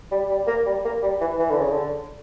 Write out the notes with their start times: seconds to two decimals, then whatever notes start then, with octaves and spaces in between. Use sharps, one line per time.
0.12 G3
0.30 G3
0.47 A#3
0.66 G3
0.85 A#3
1.02 G3
1.20 E3
1.39 E3
1.50 D3
1.60 C#3
1.71 D3